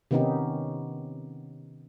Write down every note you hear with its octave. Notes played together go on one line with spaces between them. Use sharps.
C3 D#3 B3 C#4 D#4 G4